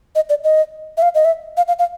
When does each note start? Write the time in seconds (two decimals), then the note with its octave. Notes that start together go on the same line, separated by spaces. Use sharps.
0.15 D#5
0.30 D5
0.44 D#5
0.97 E5
1.02 F5
1.15 D#5
1.25 E5
1.57 F5
1.68 F5
1.79 F5